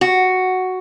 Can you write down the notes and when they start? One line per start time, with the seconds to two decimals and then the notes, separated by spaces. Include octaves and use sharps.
0.01 F#4